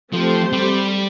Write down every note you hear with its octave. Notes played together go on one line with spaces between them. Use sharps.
F3 A3 C4 G4 C5
G3